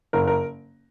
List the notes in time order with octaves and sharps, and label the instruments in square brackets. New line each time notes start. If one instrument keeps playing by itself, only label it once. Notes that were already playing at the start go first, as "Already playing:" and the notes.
[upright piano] F#1 A#4
A#4